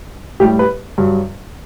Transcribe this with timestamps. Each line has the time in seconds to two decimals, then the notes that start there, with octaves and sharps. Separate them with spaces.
0.40 A2 G3 G4
0.59 B4
0.98 G2 F#3